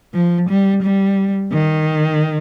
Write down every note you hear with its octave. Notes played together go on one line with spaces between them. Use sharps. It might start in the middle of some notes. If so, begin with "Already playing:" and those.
F3
G3
G3
D#3